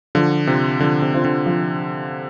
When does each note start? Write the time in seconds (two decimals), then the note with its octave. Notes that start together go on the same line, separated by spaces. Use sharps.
0.15 D3 F3
0.47 C3 C4 F4 C5
0.80 D3 F3
1.02 C3
1.13 C4 F4 C5
1.25 D3
1.46 F3